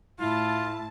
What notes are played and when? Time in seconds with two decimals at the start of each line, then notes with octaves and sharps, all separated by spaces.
0.19 A2 E4 F4 A5